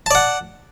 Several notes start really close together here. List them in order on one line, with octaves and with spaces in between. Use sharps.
A5 D5 F#5